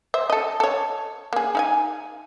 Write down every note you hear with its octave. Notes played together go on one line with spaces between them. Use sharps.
C5 E5
A4 D#5
A4 C#5
A#3 G#4
D#4 F5 G#5